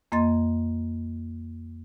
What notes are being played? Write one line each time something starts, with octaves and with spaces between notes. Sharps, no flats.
F2 A#3 D#5 C6 A6